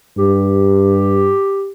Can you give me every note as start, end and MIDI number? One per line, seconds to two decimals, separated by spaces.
0.18 1.33 43
0.18 1.72 67